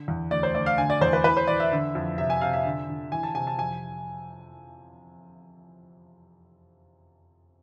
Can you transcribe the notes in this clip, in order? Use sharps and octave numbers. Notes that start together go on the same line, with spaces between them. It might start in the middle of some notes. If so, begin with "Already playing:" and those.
Already playing: D3
E2
D2 D5
C5
D2 D5
F5
D3 G#5
D5
E2 C5
B4
E3 B4
C5
E3 D5
E5
D3
F2
C3 E5
G#5
C3 F5
E5
D3
D3
E3 G#5
A5
C3 G#5
A5
F2 G#5